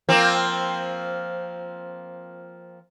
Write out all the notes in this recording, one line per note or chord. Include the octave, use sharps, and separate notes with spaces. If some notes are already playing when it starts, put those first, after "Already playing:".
F3 A#3 C4